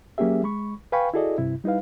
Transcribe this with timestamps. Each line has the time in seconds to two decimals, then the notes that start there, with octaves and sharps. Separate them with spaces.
0.18 F#3 A#3 C#4 G4 G#4 E5
0.43 G#3 B5 C#6
0.92 B4 F5 G5 G#5 B5 C#6
1.14 E4 F#4 G#4 A4 D5 D#5
1.38 G2 C3 E4
1.64 G3 D#4 E4 B4 F5